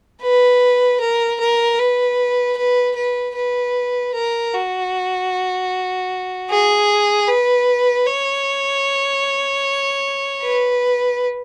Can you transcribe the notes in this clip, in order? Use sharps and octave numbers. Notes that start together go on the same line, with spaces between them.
B4
A#4
A#4
B4
B4
B4
B4
A#4
F#4
G#4
B4
C#5
B4